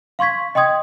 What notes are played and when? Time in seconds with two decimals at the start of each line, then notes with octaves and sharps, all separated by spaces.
0.19 F5 C6 C#6 G#6 B6
0.55 D#5 G5 C6 D#6 G#6